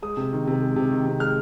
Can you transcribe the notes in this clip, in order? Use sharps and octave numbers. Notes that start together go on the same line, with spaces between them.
G#3 D#6
C3
D#3
C3
G#3
C3
D#3
C3
G#3 F6